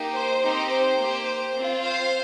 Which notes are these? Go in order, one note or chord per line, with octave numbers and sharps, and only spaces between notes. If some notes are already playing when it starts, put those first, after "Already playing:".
Already playing: A#3 D#4 G4
C5
C4 D#4 G4
C5
A#3 G4
C5
C4 F4
C5 F5